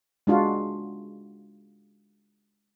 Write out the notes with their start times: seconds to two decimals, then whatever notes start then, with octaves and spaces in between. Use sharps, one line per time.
0.27 G#3 D4 F4 F#4